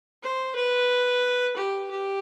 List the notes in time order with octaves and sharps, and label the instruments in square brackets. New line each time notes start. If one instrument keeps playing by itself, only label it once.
[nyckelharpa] C5
B4
G4
G4